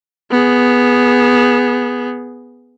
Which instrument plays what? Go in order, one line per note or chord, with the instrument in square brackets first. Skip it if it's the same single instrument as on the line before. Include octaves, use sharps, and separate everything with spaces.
[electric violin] B3 G#4